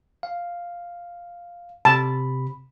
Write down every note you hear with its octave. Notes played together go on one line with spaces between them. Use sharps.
F5
C3 A5 B5